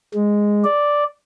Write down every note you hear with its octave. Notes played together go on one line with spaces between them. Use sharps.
G#3
D5